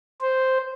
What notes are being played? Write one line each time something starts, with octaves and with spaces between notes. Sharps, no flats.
C5